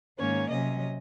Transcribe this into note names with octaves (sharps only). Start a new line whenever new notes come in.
G#2 D#3 A#3 C#4 C#5
C3 F#3 C#4 D#5